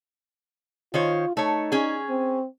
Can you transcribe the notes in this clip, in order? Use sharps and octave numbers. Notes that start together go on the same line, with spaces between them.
D#3 F4 C5 C#5
A3 D#4 C#5
C#4 G#4
C4